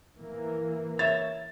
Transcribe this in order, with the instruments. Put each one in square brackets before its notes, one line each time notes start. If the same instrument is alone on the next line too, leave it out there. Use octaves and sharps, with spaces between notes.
[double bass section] E3 A#3
[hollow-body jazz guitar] C#5 E5 [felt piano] A6